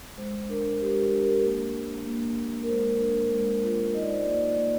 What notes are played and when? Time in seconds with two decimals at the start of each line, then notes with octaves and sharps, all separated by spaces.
0.17 G#3 C5
0.49 D4 A#4
0.80 G#3 G4
1.12 D4
1.23 A#4
1.44 A#3
1.75 D4
2.07 A#3
2.37 A#3
2.63 A#4
2.69 G#3 C5
3.00 D4
3.32 G#3
3.63 F4
3.94 D#4 D#5
4.02 D5
4.10 C5
4.18 D5
4.26 A#3
4.58 A#3